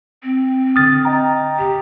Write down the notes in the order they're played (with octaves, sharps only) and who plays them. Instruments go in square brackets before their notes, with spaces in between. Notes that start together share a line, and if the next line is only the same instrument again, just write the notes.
[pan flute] C4
[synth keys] D3 F6 [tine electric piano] D#6 A6
[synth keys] D#5 G5 A#5
[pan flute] G4 [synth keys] G5